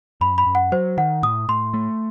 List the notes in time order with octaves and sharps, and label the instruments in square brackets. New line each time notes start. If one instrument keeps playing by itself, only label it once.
[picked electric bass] F#2 [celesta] B5
[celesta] B5
[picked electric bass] F#2
[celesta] F#5
[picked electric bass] F#3 [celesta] C5
[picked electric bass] D#3 [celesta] F#5
[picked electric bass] A2 [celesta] D#6
[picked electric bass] A2 [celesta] C6
[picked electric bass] A3